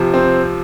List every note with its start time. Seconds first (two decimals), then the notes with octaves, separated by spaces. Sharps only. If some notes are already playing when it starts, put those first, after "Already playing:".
Already playing: C3 F3
0.14 C4